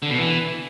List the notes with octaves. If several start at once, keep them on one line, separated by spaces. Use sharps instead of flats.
D3
B2
E3